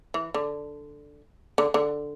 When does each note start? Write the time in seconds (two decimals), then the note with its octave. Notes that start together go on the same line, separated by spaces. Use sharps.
0.14 E3
0.34 D3
1.58 D3
1.74 D3